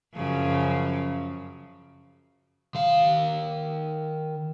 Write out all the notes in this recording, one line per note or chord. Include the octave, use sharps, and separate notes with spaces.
F#2 C#3 F3
D#3 F5